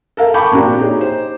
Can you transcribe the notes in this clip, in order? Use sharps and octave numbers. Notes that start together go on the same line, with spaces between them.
A4 A#4 F5
G5 A5 B5 C#6 D6 G6
A#2 A#3 C4 D4 F#4
D#4 G4 G#4 C#5
C5